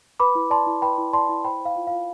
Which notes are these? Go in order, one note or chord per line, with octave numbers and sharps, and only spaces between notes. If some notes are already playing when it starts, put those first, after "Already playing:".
B4 B5 D6
E4
D5 A5 C6
E4
B4 G5 B5
E4
D5 A5 C6
E4
C5 G5 B5
C5 F5
F4
F5
F4